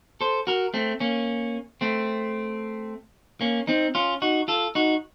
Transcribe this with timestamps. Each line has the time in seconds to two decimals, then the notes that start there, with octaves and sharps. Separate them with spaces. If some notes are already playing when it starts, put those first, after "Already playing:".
0.21 A4 C5
0.47 F#4 A#4
0.74 A3 C4
1.00 A#3 C#4
1.81 A3 C4
3.41 A#3 C#4
3.67 C4 D#4
3.95 C#4 F4
4.22 D#4 F#4
4.48 F4 A4
4.75 D#4 F#4